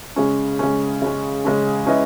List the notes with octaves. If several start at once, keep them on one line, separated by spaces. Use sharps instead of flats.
C#3 G#3 C#4
C#3 G#3 C#4
C#3 G#3 C#4
C#3 G#3 C#4
G#3 C#4 E4 B4 D#5